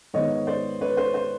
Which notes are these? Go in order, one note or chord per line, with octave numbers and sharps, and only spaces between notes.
G#2 D#3 G#3 B3 C#5 D#5
C5 D5
B4 C#5
C5
C5